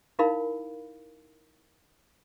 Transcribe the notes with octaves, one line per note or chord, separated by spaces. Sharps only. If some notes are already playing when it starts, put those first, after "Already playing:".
D#4 E4 A#4 F5 B5